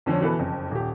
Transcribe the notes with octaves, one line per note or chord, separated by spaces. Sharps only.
F2 D3 F3 C4 C#4
B2 E3 A4 B4
F#1 F2
D#1 G4